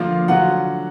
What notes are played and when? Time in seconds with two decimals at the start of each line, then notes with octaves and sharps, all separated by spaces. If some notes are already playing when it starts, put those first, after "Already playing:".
Already playing: D3 F3 A#3 D4 F4 F5
0.28 D3 F#3 D4 F4 F#5